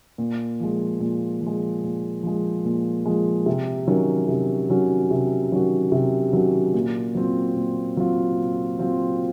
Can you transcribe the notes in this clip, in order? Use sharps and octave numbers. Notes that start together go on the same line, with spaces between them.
A#2
F3 G#3
A#2
F3
G#3
A#2
F3 G#3
A#2
F3 G#3
C3
D#3 F#3 C#4 F#4
C3
D#3 F#3 C#4 F#4
C3
D#3 F#3 C#4 F#4
C3
D#3 F#3 C#4 F#4
A#2
F#3 C4 F4
A#2
F#3 C4 F4
A#2
F#3 C4 F4